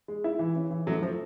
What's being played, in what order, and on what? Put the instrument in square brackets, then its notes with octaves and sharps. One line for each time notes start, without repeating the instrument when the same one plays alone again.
[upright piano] G#3
E4
E3
C#4
E3
[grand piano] F#2 F#3 [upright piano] A3
[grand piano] F3 [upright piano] A3